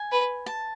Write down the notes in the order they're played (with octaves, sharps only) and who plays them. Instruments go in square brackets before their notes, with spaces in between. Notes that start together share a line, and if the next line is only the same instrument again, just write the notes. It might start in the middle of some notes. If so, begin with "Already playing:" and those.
Already playing: [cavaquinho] G#5
[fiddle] B4
[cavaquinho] A5